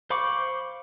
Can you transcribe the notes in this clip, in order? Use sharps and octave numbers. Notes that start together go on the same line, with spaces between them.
C5 F5 B5 C#6 D6